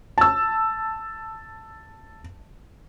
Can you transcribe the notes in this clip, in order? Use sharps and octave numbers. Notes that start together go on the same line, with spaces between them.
A5 E6